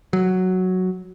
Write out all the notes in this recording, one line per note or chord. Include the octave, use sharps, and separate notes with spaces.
F#3